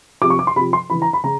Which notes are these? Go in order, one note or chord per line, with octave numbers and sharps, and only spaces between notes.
C3 F3 D6
C#6
D6
C6
C3 F3 B5
C6
C#3 E3 B5
A#5
B5
C#3 A#5